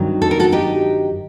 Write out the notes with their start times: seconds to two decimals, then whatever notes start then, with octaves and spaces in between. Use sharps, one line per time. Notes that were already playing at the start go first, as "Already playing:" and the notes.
Already playing: G2 D#3 F#3 C4
0.22 A4
0.31 A#4
0.40 F#4 A4
0.52 D#4 G4